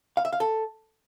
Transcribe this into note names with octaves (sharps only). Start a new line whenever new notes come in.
F5
E5
F5
A4